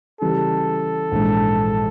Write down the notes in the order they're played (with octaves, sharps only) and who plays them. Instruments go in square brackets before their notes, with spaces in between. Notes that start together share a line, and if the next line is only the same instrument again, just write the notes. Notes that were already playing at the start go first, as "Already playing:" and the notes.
[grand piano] C#3 E3 G3 [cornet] A4
[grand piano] A#1 G#2 E3 G#3